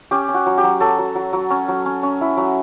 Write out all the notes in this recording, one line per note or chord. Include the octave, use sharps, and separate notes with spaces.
C#4 G4
C#4
F#4
F#3
G4
F#3
F#3 A4
F#3
F#3
F#3
C#4
F#3
C#4
C#4
E4
F#3